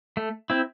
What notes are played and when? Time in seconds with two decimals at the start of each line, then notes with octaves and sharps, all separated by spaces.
0.17 A3
0.50 C4 E4